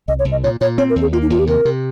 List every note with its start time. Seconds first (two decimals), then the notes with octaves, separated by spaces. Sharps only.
0.08 C2 D#5
0.19 C#5
0.25 C2
0.32 D#5
0.43 A#2 C#5
0.61 A#2 C#5
0.78 C4 C#5
0.90 A#4
0.96 D#2
1.02 G#4
1.12 A#3 F4
1.22 D#4
1.30 D#2 F4
1.39 G4
1.47 C3 A#4
1.65 C3